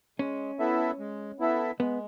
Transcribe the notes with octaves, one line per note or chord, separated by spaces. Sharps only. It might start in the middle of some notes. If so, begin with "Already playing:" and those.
G#3 C#4
B3 E4 A4 E5
G#3
B3 E4 A4 E5
G#3 B3